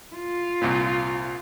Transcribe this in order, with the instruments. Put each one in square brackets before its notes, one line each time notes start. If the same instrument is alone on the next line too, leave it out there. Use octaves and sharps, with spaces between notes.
[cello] F4
[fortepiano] C2 A#2